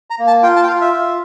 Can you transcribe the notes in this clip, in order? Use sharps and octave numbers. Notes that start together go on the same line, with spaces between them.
A#5
A#3
A5
F4 G5
A5
G5
F4 F5
E5
F4